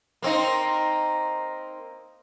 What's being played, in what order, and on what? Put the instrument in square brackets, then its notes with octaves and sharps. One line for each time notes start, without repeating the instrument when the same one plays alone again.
[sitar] A#3 C4 D#4